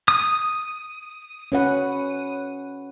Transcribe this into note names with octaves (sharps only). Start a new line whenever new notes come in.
D#6
C#4 B4 F#5